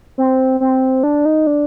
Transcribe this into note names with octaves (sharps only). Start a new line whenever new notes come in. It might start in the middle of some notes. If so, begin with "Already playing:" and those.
C4
C4
D4
D#4
D4